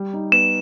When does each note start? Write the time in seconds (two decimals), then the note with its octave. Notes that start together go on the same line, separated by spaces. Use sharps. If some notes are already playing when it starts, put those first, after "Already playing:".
Already playing: G3
0.13 D#4
0.32 B3 E7